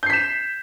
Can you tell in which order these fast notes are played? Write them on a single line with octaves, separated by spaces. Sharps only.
G6 C7 B6 E7